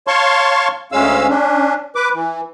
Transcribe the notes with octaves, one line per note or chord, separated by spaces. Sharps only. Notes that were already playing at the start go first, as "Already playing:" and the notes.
C#5 F5 A5 C6 C#6
D2 G#3 C#4 F5 E6
C#4 D4
B4 D6
E3